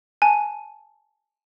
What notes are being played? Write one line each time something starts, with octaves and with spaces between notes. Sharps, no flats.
G#5 A5